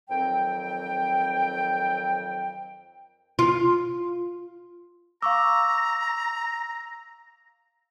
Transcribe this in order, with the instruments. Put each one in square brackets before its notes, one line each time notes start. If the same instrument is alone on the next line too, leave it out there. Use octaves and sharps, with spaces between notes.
[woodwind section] F2 D#3 F#3 C4 G5
[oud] F4
[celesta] F5 C#6 D6 [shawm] A#5 [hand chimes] E6